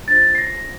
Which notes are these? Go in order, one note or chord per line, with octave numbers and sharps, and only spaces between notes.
D4 F4 C5 A6
C7
A#6